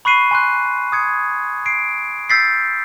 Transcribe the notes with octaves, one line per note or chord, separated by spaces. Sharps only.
B5 C#6 F#6 C7 D#7
G#5 C6 F#6
D#6 G#6 C#7
C7 D7
E6 G6 A6 B6 C7